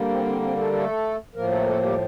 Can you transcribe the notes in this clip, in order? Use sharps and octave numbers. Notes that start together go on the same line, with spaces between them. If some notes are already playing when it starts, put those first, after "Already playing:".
Already playing: D3 G3 A#3
C4
C4
C4
A3 A4
A3 A4
A2 F3 A#3 A#4
A3 A4
A#4
A3 A4
G3 G4